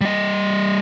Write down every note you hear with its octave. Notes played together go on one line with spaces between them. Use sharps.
G3 D#5